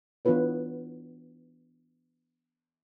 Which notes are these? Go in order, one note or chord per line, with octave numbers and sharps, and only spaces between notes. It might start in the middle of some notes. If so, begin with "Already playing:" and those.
E3 B3 D4 F4 B4 C#5